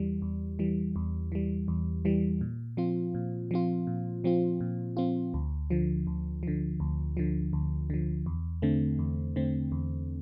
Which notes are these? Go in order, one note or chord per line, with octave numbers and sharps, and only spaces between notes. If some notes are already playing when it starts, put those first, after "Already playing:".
Already playing: E2 E3 G3
E2
E3 G3
E2
E3 G3
E2
E3 G3
A#2
F3 C4 F4
A#2
F3 C4 F4
A#2
F3 C4 F4
A#2
F3 C4 F4
D2
D3 F3
D2
D3 F3
D2
D3 F3
D2
D3 F3
E2
D3 A3 C4
E2
D3 A3 C4
E2